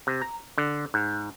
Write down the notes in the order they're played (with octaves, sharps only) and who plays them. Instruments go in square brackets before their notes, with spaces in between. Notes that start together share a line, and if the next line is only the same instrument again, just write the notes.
[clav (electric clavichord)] C3
A#5
D3
G#2